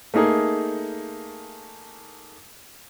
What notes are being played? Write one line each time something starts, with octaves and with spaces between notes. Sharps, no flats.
A3 A#3 D#4 G#4 A#4